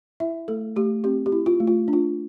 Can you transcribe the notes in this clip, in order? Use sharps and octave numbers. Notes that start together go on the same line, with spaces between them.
E4 E5
A3 A4
A3 G4
C4 G4
G4
E4
F4
A3
F4
D4
F4